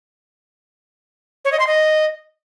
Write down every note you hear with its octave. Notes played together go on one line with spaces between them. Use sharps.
C#5
D#5
C6
D#5